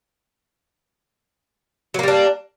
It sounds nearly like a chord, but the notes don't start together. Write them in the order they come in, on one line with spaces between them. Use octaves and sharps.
F#3 A#3 G3 D4